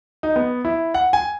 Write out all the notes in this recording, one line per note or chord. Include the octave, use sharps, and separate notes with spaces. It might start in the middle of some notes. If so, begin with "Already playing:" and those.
D#4
B3
E4
F#5
G#5